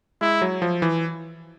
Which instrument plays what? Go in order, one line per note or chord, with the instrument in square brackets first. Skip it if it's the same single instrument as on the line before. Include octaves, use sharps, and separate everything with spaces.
[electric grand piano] G#3 [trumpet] E4
[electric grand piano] F#3
F3
E3